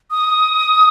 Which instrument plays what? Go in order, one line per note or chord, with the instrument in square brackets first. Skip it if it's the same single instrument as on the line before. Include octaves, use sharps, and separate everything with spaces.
[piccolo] D#6